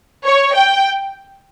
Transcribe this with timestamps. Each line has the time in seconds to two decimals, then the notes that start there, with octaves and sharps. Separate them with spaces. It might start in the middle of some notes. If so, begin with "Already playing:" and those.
0.24 C#5
0.54 G5